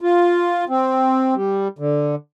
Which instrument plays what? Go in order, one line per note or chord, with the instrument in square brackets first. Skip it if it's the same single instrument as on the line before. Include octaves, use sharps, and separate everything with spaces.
[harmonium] F4
C4
G3
D3